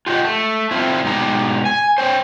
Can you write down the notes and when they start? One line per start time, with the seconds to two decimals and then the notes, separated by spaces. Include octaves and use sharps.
0.06 F4 G4 A#4 D#5 F#5
0.24 A3
0.71 C4 E4 F4
1.04 G#2 B2 B3 G4 A#5
1.65 G#5
1.98 C5 C#5 G5